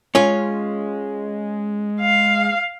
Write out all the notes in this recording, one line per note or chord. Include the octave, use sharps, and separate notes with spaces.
G#3 C#4 F4
F5